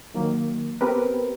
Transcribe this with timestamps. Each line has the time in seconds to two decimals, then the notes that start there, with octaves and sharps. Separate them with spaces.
0.14 D#3 F#3 A#3
0.81 B3 C4 G4 A#4 B4